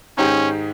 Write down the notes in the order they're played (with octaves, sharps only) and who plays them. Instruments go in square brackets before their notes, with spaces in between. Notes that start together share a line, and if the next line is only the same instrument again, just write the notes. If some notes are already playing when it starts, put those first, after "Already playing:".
[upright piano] G#2 D#3 G#3 D#4 G4 [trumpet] C#4